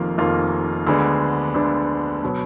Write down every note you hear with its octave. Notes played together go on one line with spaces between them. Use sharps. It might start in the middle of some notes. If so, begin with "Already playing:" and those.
Already playing: F1 F2 D#3 A#3 F4
F1 F2 D#3 A#3 F4
D2 D3 G#3 B3 D4
D2 D3 G#3 B3 D4
B2 F#3 B3